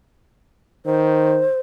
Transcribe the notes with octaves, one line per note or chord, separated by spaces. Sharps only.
D#3 C5